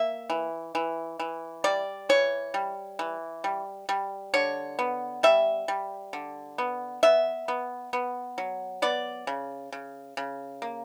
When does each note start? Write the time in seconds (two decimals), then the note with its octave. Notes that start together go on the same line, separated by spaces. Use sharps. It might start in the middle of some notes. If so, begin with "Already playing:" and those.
Already playing: A#3 E5
0.30 E3
0.75 E3
1.20 E3
1.64 G3 D5
2.09 E3 C#5
2.54 G3
2.99 E3
3.44 G3
3.89 G3
4.34 D3 C#5
4.79 B3
5.23 G3 E5
5.68 G3
6.13 D3
6.58 B3
7.03 B3 E5
7.48 B3
7.93 B3
8.38 F#3
8.82 B3 D5
9.27 C#3
9.72 C#3
10.17 C#3
10.62 A#3